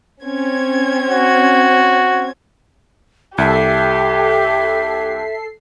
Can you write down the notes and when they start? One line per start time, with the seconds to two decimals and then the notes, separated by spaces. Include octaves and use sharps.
0.23 C4 C#4 G#6
1.10 F#4
3.38 C2 G4 A4 E5 C7